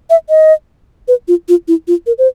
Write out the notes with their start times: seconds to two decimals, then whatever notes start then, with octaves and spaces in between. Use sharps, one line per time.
0.10 E5
0.29 D#5
1.08 B4
1.28 F4
1.49 F4
1.68 E4
1.88 F4
2.07 A#4
2.18 C5